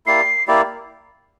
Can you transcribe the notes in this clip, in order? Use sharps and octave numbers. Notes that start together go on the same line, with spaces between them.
A#3 E4 G4 D5 C7
A#3 E4 G4 D5